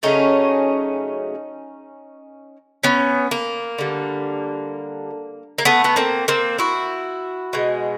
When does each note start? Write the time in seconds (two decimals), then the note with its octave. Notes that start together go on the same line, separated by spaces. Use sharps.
0.03 C#3 F#3 A3 C#4 D#4
2.83 B3 C#4
3.31 A#3
3.78 D3 G3
5.58 A#3
5.65 A3 B3
5.84 B3
5.96 A#3 C4
6.28 A#3 C4
6.59 E4 F#4
7.53 B2 G#3